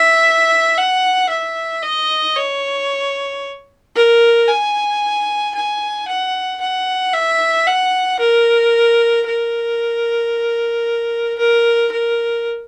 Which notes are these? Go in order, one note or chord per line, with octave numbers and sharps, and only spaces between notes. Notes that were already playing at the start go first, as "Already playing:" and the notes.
Already playing: E5
F#5
E5
D#5
C#5
A#4
G#5
G#5
F#5
F#5
E5
F#5
A#4
A#4
A#4
A#4